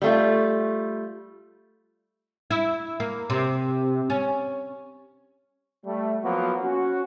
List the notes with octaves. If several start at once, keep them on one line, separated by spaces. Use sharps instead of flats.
G3 A3 F4
E4
A#3
C3
C#4
G3 A3
F3 F#3 A#3 B3 F#4
C#4 F#4